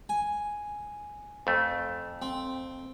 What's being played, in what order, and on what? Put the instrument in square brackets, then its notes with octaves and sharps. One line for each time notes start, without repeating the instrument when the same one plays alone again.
[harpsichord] G#5
[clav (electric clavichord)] F2 A3
[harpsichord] C4